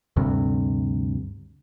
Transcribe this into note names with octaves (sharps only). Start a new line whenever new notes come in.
D2 G2 C3